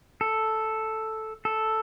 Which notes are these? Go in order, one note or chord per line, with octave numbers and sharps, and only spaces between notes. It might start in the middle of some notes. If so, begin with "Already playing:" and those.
A4
A4